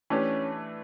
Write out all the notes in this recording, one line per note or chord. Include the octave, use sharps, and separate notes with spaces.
E3 A3 C#4 D4 G4